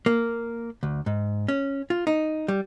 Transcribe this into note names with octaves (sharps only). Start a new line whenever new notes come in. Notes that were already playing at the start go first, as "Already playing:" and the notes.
A#3
D2
G#2
C#4
F4
D#4
G3